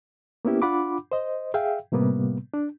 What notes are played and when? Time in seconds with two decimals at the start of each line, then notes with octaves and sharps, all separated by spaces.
0.45 A#3 B3 C#4 E4 G4
0.62 D4 F4 F#5 B5 D6
1.12 C5 D#5
1.54 G#4 E5 F5 G5
1.92 A2 C3 G3 A#3 B3
2.53 D4